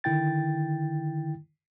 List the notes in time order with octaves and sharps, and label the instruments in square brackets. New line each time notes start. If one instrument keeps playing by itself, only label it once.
[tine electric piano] D3 D#3 E4 G5 A6